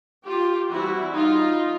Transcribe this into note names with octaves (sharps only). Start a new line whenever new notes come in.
F4 G4
E3 G3 C4 E4 F#4
D#4 F4